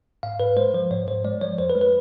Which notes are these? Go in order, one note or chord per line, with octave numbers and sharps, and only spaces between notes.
G#2 F5
G#2 B4
G#3 C5
F3 C5
G#2 C#5
G#2 C5
G#3 D5
F3 C#5
F2 C5
B4
G#3
B4